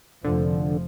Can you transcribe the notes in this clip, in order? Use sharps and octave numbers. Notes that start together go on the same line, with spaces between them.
F1 D3 F3